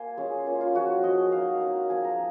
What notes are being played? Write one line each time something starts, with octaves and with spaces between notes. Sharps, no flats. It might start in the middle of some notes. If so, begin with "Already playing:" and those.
Already playing: A#3 C5 G#5
G#3 C#4 F4
A#3 C#4 F4
F4
F3 G#3 C#4 F#4
F3 G#3 C4 D#5
F#3 A#3 D#4 F5
A#3 C#4 F4 F#5
F3 G#3 C4 F4 G#5
A#5